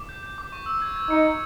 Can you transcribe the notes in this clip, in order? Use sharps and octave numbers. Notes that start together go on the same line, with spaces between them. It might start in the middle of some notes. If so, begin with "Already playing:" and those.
Already playing: D6
G6
G6
D6
C#6
E6
G#6
G#6
D#4 C#7
G#6